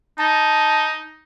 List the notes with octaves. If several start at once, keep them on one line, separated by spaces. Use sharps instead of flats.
D#4 A5